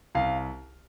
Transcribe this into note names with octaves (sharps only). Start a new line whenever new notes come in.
C2 F5